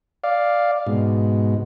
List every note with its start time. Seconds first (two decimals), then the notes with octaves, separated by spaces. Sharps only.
0.24 D5 F5
0.87 G#2 B2